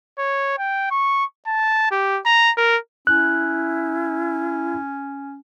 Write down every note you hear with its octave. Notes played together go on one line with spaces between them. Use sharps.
C#5
G5
C#6
A5
G4
A#5
A#4
C#4 E4 F#6